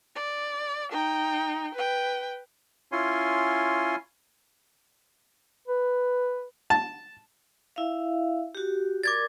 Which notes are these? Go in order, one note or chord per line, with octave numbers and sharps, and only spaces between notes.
D5
D#4 G5
B4 G5
C#4 E4 F4 C#5 G#5 C6
B4
A5
E4 E5 F5
F#4 G4
A#4 D5 D6 G#6 A6